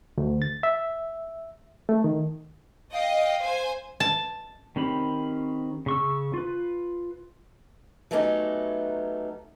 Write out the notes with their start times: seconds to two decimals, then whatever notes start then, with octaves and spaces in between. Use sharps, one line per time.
0.18 D2
0.42 A6
0.63 E5
1.89 A3
2.04 D#3
2.92 D#5 F5 G5
3.42 C5 G#5
4.00 A5
4.76 D#3 C4 C#4 G4 B5
5.86 C#3 C#6 E6
6.34 F4 B4
8.11 F#3 A3 B3 C#4 D#4 G4